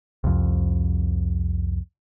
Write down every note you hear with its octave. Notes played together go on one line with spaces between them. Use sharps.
C2 F2